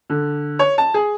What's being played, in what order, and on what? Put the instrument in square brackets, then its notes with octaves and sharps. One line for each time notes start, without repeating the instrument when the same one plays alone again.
[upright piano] D3
C#5
A5
G#4